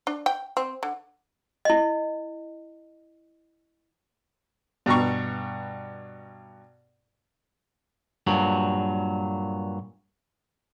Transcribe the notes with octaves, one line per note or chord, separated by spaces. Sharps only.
D4
G5
C4
D3
E4 D#5
G2 B2 A#5 C#6
G2 A#2 F#3